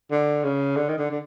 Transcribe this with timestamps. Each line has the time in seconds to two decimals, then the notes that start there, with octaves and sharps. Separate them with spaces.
0.11 D3
0.44 C#3
0.76 D3
0.89 D#3
0.98 D3
1.10 D3